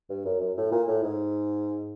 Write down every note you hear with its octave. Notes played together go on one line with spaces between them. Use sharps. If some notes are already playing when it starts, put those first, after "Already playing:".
G2
F#2
F#2
A2
A#2
A2
G#2